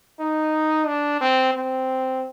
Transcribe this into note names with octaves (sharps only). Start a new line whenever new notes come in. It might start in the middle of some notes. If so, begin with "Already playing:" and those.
D#4
D4
C4
C4